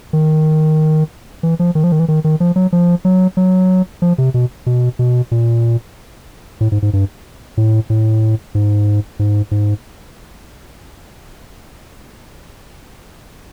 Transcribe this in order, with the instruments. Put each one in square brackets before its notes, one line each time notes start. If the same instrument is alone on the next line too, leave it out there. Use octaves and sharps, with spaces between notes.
[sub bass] D#3
E3
F3
D#3
F3
D#3
E3
D#3
D#3
F3
F#3
F3
F#3
F#3
F3
C3
B2
B2
B2
A#2
A2
G#2
G#2
G2
A2
A2
G#2
G#2
G#2